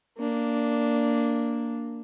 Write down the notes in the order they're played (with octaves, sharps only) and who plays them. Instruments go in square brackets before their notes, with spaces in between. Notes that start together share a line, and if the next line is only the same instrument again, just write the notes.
[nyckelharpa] A#3 D4